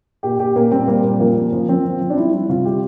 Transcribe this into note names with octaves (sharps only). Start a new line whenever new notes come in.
A#2 G4
A#2 G4
A#2 A#3
G3 C4
G3 A#3
A#2
F3 A#3
F3
F3
F3 C4
F3
F3
D4
G3 E4
G3 E4
C3 F4
G3 G4